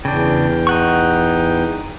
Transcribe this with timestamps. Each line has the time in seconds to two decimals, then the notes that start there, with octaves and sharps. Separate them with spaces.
0.05 E2 C#3 D4 G5
0.67 D#4 F#5 C#6